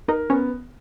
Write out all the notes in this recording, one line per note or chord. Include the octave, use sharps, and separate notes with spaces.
D#4 A#4
B3 C#4